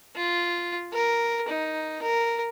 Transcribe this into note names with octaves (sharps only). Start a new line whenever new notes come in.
F4
A#4
D#4
A#4